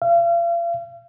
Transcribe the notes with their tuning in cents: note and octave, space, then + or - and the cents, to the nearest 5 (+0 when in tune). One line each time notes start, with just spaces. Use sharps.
F5 -40